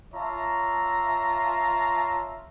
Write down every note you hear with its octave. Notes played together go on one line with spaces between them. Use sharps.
F4 C#5 E5 A5 A#5